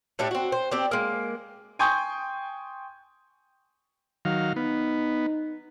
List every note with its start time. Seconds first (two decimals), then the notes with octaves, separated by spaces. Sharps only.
0.19 A2 A3 D4 G4
0.31 C4 F#4
0.52 C5
0.71 C4 D4 G4
0.91 G#3 A#3
1.79 G5 G#5 C6 C#6 D#6 G6
4.25 D#3 F#3 F5
4.56 B3 D#4